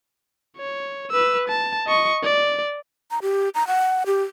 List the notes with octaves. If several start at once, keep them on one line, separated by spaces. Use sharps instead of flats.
C#5
B4 E6
A5
D#5 C#6
D5
A#5
G4
A#5
F#5
G4